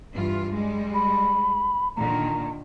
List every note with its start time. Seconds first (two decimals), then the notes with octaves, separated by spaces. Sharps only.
0.13 G2 E3 F4
0.53 G3 G#3
0.94 B5
1.96 A#2 D3 D#3 A#5